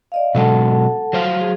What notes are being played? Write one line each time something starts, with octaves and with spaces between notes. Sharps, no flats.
D5 D#5 F5
B2 F#3 G#3 A4 F#5 A5
F#3 C5 F5
G#4